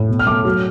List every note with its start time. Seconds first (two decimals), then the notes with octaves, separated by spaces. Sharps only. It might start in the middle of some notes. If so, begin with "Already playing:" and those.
Already playing: A2
0.09 B2
0.19 F6
0.27 A3 D6
0.45 F#3